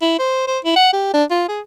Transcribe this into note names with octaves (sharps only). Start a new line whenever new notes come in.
E4
C5
C5
E4
F#5
G4
D4
F4
G#4